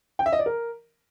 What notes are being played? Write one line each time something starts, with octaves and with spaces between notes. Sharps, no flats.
G5
E5
D#5
D5
A#4